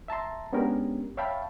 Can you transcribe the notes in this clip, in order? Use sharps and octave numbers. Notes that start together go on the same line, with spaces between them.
E5 A5 A#5 C6
G#3 B3 C#4 D4 G4 A#4
C#5 E5 F5 G5 A5 B5